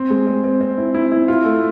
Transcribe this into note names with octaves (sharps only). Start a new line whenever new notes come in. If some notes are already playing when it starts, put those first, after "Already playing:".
Already playing: C4
G#3
C4
C4
C4
E4
E4
E4
F4
A3